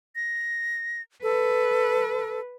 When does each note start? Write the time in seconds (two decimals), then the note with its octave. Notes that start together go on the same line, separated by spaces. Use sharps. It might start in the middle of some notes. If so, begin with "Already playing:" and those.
0.16 A#6
1.23 A4 B4